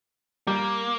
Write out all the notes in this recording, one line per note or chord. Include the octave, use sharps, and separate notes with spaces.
G3 A#3